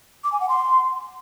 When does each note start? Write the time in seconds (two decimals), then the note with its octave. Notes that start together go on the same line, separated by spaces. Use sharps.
0.24 D6
0.32 G#5
0.41 F#5
0.49 C6